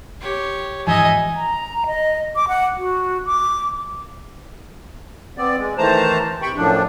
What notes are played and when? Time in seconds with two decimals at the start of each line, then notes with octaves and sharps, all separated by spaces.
0.21 G4 C#5
0.87 G#2 E3 F3 D#4 D#5 E5 G#5
1.35 A#5
1.86 D#5
2.36 D6
2.48 F#5
2.78 F#4
3.25 D6
5.38 B3 C4 D5
5.57 G#3
5.78 D#3 E3 A3 C5 A5 A#5
6.42 C3 G5 B5 C#6
6.56 F#2 A2 F3 D4